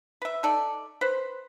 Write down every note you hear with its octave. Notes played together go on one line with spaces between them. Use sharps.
B4 E5
D#4 A4 D5
B4 C5